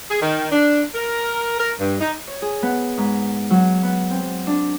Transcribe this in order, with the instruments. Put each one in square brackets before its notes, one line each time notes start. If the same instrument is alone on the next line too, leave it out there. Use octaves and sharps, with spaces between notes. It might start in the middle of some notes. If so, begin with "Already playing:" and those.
[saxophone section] G#4
D#3
D4
A#4
A#4
G2
D#4
[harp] C#5
G#4
B3
G#2
F#3
B3
C4
D4